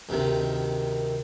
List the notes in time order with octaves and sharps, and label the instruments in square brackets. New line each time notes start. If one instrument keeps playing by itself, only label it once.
[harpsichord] D2 C3 D#3